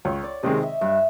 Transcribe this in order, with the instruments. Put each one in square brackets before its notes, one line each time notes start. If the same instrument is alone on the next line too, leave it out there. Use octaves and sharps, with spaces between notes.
[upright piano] C#2 [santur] C#5
[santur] D5
[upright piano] C3 D#3 G#3 C4 [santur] D#5
[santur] E5
[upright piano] G2 [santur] E5